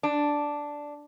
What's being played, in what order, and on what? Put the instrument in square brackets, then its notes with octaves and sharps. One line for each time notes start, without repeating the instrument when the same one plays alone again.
[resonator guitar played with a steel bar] D4